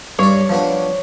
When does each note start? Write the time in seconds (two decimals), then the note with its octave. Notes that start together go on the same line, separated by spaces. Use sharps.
0.19 G2 C#5 D5
0.49 F3 B3 D4